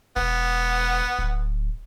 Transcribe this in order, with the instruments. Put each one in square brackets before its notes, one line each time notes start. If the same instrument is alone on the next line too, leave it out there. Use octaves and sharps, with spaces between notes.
[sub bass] E1 [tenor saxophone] B3
[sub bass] D1